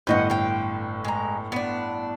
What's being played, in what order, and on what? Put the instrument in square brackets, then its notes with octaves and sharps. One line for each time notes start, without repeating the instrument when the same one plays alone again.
[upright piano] G1 A2 G6 [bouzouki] B4 D#5 F#5
[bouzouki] F5 G5
G#3 A#5
B3 D4